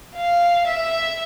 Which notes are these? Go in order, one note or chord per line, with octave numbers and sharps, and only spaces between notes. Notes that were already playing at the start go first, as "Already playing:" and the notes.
F5
E5